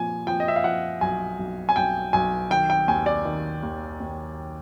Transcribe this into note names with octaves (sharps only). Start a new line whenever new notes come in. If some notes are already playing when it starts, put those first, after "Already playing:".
Already playing: A#2 F3 G#5
F3 G5
D#5
E5
F5
F3 F#5
B1 G#5
B1
G#5
B1 G5
B1 G#5
D#3 G5
G5
D#2 G#5
D5
D#3
D#2
D#2